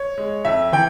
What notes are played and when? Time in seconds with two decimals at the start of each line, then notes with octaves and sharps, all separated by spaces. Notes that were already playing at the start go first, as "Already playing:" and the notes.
Already playing: C#5
0.18 G#3
0.45 F2 E5
0.72 E3 G5